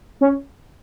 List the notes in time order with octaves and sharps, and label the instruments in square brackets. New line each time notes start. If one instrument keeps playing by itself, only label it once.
[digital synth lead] C#4